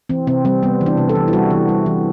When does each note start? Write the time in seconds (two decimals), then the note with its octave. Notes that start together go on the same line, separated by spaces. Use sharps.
0.09 E3 C4
0.27 C3 C4
0.45 G3 C4
0.63 G3 B3
0.81 E3
0.86 D4
0.97 C3
1.09 A4
1.15 E3
1.28 E4
1.33 G3 F#4
1.51 E3
1.69 G3
1.86 E3